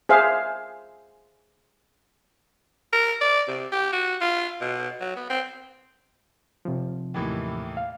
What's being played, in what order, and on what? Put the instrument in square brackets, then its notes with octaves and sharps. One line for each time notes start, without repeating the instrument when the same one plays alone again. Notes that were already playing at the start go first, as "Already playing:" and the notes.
[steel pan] G#4 C5 E5 F5
[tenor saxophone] A#4
D5
C3
G4
F#4
F4
B2
F#3
B3
C4
[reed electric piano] C3 F3
[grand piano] D#2 A2 E3
[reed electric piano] F5